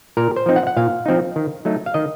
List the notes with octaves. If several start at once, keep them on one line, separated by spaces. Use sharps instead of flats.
A#2 A#4
C5
F3 C4 D#4
F#5
F#5
A#2 F5
F3 C4 D#4
D#3
F#3 A3 D#4
F5
D#3 D#5